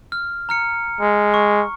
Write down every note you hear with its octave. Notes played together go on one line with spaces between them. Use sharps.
F6
A#5 F6 C#7
G#3
C#6